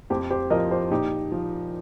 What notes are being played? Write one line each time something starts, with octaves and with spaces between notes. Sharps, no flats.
F2 G4 C5
G4 C5
F3 A#4 D#5
G4 C5
A#2 D#4 G4
F3